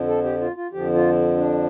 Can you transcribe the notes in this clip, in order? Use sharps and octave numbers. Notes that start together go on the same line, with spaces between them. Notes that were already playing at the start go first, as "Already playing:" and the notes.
Already playing: F2 D3 F3
A4
G4
F4
F4
F2 D3 F3 G4
F4
D4